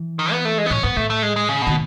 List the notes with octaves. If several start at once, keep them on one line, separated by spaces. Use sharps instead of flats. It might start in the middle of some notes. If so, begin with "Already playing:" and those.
Already playing: E3
D#3
B3
A3
G#3
B3
A2 C#4
G#2 B3
A2 A3
A3
G#3
G#3
C#3
B2
D#3